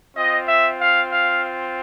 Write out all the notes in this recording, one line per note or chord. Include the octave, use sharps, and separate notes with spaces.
C4 F4 D#5
E5
F5
F5